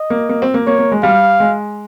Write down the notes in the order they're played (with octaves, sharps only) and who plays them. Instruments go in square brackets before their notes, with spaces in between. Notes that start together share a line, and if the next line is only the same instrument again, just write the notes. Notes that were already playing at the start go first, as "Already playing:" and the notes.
Already playing: [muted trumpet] D#5
[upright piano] A#3
A#3
C4
A#3
[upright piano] A#3 [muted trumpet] C#5
[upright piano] A#3
G#3
[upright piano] G3 [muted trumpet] F5
[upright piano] G#3